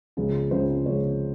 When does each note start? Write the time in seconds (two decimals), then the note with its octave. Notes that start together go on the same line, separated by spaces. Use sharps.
0.17 C#2 C#3 F3
0.51 C#2 C#3 F3 C5
0.86 C#2 C#3 F3 C#5